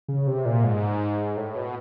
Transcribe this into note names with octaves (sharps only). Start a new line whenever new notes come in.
C#3
C3
A#2
G#2
A2
B2